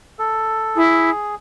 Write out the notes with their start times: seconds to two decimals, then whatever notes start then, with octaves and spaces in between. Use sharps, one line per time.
0.19 A4
0.76 E4 G#4